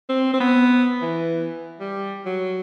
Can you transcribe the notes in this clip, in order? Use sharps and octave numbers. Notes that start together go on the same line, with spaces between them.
C4
C4
B3
E3
G3
F#3